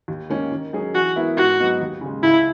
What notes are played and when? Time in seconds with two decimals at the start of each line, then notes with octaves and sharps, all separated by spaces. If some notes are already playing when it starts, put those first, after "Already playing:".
0.08 D#2
0.30 D#3 A#3 C#4
0.52 D#3
0.73 F#3 C#4 G#4
0.95 E3 F#4
1.16 B3 E4 A#4
1.37 G#2 F#4
1.59 F#3 B3 D#4
1.81 D#2
2.01 C#3 G#3
2.23 C#2 E4